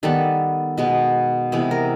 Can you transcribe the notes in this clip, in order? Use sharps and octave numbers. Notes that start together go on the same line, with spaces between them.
D#3 G3 B3 A4
B2 G#3 B3
C3 E3 G#3 B3
A#4